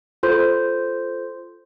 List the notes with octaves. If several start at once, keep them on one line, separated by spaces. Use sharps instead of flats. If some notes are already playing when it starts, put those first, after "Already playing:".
F4 A4 C5 C6 G6